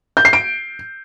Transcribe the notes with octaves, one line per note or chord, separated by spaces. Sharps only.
G6
C7
D7